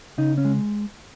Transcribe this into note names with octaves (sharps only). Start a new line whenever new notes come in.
C#3 D#4
C#4
G#3